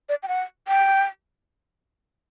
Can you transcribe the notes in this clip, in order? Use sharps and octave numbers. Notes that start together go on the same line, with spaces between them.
D5
G5
F#5
G5